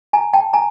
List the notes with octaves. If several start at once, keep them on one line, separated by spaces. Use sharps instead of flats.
G#5 A#5
G5 A5
G#5 A#5